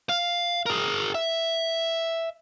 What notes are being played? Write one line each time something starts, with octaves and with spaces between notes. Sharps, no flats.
F5
G#4 A#4
E5